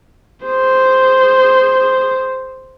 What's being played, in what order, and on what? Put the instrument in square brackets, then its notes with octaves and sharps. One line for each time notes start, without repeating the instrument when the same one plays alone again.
[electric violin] G#4 C5